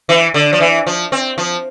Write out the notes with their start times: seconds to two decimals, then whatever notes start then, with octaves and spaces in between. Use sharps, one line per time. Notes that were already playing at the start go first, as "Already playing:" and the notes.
0.09 E3
0.34 D3
0.53 F3
0.60 E3
0.87 F3
1.12 C4
1.38 F3